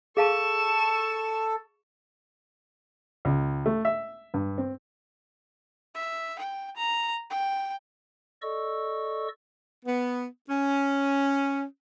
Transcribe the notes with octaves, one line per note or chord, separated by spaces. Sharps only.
G#4 A4 F5 A5 C#6 E7
C#2
A3
E5
G2
C4
E5
G5
A#5
G5
A4 D5 D#5 C#6 E6
B3
C#4